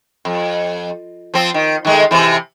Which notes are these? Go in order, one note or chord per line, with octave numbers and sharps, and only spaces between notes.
F2
F3 C4
D#3
D#3 G#3 A3
C3 E3